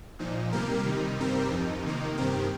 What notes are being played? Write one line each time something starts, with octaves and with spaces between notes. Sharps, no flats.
A#2 F3 D#4
C3 G3 A#3 G4 A#4
C3 D#3 G3 D#4
G2 G3 C4 G4 A#4
F2 F3 D#4
C3 D#3 A#3 D#4
G2 D#3 C4 G4 A#4